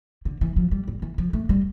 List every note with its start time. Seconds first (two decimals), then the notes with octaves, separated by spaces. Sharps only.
0.25 D3
0.41 E3
0.56 F3
0.71 G3
0.88 G3
1.02 E3
1.18 F3
1.33 A3
1.49 G3